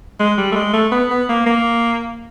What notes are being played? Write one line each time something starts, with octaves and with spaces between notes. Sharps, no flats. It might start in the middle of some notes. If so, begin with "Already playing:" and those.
G#3
G3
A3
G#3
A3
B3
B3
A#3
A#3